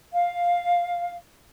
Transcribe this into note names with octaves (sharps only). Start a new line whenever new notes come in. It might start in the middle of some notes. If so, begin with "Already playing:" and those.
F5